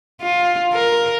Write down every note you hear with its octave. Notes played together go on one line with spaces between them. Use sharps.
F4
A#4